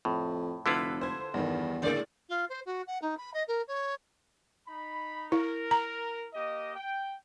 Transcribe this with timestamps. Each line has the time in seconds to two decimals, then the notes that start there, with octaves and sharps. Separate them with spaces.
0.05 F2 A2
0.66 F1 D3 E4 F4 A4 B4
1.01 C5 G#6
1.34 E2 G2 D#3
1.82 A2 C#3 G#3 A#3 D5
2.29 F4
2.49 C5
2.66 F#4
2.87 F#5
3.02 D#4
3.17 B5
3.34 D#5
3.48 A#4
3.68 C#5
4.68 D#4 B5
5.32 E4 A#4
5.71 A#5
6.34 A#3 G4 D#5
6.76 G5